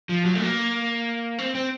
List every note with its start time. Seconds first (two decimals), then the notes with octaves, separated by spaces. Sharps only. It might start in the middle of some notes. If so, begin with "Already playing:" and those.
0.09 F3
0.25 F#3
0.35 A3
0.42 A#3
1.39 C4
1.55 C4